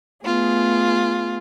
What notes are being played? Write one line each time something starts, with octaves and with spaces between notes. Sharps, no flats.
A3 B3 F4 G#4